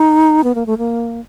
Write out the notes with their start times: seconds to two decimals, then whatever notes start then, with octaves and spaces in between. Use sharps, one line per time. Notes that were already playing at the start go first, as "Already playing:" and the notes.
Already playing: D#4
0.44 B3
0.55 A#3
0.66 A3
0.78 A#3